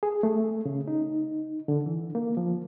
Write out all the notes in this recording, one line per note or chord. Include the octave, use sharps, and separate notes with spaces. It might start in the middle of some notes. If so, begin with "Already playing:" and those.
G#4
A3
C#3
D#4
D3
E3
A#3
F3